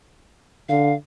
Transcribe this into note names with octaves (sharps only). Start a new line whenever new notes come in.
D3 F5